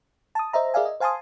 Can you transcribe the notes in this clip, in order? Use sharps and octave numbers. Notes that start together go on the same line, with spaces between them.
A5 D#6
C5 D#5 E5 A#5
G#4 A#4 D5 E5 F5 G#5
D#5
C5 F5 G#5 A5 C6 D#6